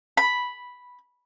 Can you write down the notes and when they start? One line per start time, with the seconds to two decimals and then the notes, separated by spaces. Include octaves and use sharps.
0.17 B5